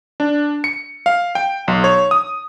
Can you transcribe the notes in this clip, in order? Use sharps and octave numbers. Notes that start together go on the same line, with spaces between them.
D4
C#7
F5
G5
B1
C#5
D#6